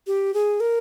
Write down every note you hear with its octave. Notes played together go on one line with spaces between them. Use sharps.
G4
G#4
A#4